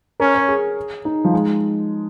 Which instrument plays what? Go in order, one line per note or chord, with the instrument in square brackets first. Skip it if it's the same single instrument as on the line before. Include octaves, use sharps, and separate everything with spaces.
[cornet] C#4 [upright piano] A#4
[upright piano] C#5
G#4
D#4
F3
G#3